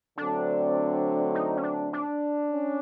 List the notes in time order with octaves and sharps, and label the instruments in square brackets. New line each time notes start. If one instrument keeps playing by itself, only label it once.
[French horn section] D3 F#3 A3 C4 [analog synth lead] D4
[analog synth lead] D#4
C#4
D4
D4
[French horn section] C#4